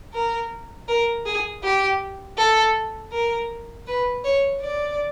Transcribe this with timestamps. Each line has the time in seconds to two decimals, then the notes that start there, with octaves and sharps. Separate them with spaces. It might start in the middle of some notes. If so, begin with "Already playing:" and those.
0.13 A#4
0.88 A#4
1.26 G#4
1.63 G4
2.38 A4
3.12 A#4
3.87 B4
4.24 C#5
4.61 D5